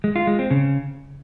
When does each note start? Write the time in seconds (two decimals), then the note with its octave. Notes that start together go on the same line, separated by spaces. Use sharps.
0.04 G#3
0.16 F4
0.27 G#3
0.39 C4
0.51 C#3